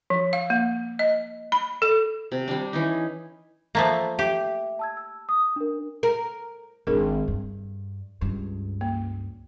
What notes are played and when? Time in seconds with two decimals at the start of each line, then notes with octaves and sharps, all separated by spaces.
0.10 F3
0.33 F5
0.50 A#3
0.99 D#5
1.52 B5
1.82 A4
2.32 C3
2.48 G3 D4
2.73 E3 C#4 D#4
3.75 F3 A3 A#3
4.19 G4 E5
4.79 A5 E6 G#6
4.97 E6
5.29 D#6
5.56 D4 A#4
6.03 A#4
6.87 G#1 D4 G#4 A#4
7.28 G2
8.21 C#2 G2
8.81 A#3